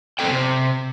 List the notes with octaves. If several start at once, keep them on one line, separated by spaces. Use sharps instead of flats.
F#2 B2 C4 A4 G5
C3